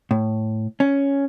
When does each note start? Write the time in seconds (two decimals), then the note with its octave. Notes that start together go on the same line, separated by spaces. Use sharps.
0.11 A2
0.80 C#4